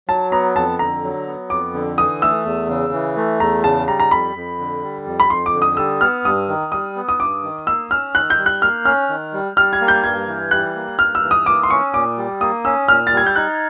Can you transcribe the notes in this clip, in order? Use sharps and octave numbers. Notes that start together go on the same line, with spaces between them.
F#3 A5
B3 A#5
F2 A5
D3 A#5
F#3
B3
F2 D6
D3
E3 D#6
A3 E6
E2
C#3
E3
A3
E2 A#5
C#3 A5
G3 A#5
A#5
F2 B5
F2
D3
G3
F2
B5
F2 C6
D6
D3
D#6
G3 E6
B3 F6
G2 D#6
D#3
G3 D#6
B3
D#6
G2 D6
D#3
A#3 E6
C#4 F6
D#3 F#6
G6
G3
F#6
A#3 F6
C#4 F6
D#3
G3
G3 F6
G#6
A#3
G6
G2 G#6
E3
G3 F#6
A#3
G2 F6
E6
E3
D#6
A#3 D6
C6
C#4 C#6
A#2 D6
G3
A#3 D#6
C#4 E6
A#2 F6
A6
G3 G#6
G6
D#4 F#6